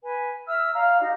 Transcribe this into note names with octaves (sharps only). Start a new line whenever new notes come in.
B4 G#5
E5 E6 F6
D5 F5 A#5 F6
D#4 F#4 G4 F5